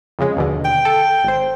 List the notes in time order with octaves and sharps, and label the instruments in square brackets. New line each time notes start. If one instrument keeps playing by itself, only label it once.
[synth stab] F2 C#3 G#3
D#2 B2 D3
[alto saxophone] G5
[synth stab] A4
G#1 C5